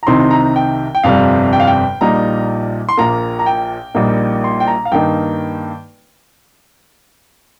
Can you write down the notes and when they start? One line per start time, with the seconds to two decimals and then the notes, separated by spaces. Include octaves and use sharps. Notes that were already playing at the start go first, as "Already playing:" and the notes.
0.03 A#5
0.07 C2 C3 D#3 C4 D#4 C6
0.20 C6
0.31 A#5
0.56 G5
0.95 G5
1.04 G1 F2 C3 G3 F5
1.53 G5
1.60 F5
1.67 G5
2.01 A#1 A#2 G3 D#4 A#5
2.89 C6
2.97 A#1 A#2 A#3 A#5
3.39 A#5
3.46 G5
3.94 A#1 A#2 G3 A#3 D#4
4.44 C6
4.60 G5
4.67 A#5
4.85 F5
4.92 G2 D#3 A#3 D#4 G5